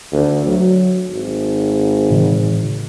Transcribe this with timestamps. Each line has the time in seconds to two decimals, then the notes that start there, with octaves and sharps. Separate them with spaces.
0.12 D2
0.46 F#3
1.10 G#1
2.10 A2 C#3 E3